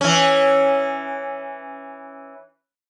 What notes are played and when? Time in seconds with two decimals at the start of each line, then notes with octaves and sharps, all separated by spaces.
0.01 E3 C#4